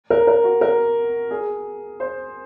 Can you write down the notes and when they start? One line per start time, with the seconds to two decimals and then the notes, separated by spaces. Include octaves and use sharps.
0.10 A#4
0.27 A#4
0.44 F#4
0.61 A#4
1.31 G#4
2.00 C5